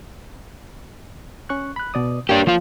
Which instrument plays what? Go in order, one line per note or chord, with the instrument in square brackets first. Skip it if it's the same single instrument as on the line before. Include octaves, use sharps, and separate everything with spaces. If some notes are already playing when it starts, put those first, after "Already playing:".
[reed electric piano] C#4 C#6 F#6
B5 F#6
B2 D5 D#6
[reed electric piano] A#3 C#5 [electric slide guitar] D4 G4
[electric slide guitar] F3 F4